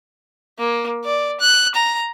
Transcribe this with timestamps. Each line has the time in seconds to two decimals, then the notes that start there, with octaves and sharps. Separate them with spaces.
0.59 A#3
1.05 D5
1.40 F#6
1.74 A#5